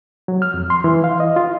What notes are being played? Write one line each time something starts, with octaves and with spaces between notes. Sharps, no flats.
F#3
F6
F2
C6
E3
F5
D#5
F4